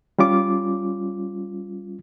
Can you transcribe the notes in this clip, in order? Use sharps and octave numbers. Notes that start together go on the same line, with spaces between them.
G3 C#4 F4 D6